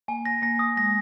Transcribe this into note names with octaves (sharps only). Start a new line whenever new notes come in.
A#3 G#5
A#6
A#3 A#6
D#6
G#3 A#6